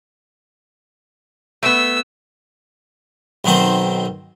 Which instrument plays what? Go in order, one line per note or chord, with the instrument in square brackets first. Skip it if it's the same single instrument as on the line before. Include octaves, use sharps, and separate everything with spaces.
[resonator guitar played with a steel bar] A3 B3 [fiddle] E6
[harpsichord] B1 B2 D#3 C4 C5